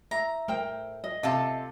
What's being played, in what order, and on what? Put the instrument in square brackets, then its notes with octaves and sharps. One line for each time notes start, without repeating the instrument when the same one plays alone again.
[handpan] E5 [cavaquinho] A#5
[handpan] A3 [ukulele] A#4 C5 G5
[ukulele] D#5
[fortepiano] C3 [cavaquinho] F4 A4 A5